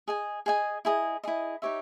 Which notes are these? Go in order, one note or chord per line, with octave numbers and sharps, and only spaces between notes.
G#4 D#5 G#5
G#4 D#5 G#5
E4 G#4 D#5
E4 G#4 D#5
D#4 G4 C#5 E5